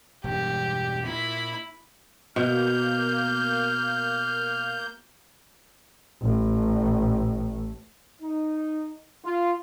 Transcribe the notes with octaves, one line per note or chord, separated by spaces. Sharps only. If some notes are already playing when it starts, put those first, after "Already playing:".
E1 G2 G4
A#2 E4 B5
B2 A#3 F6 G6
A1 A2
D#4
F4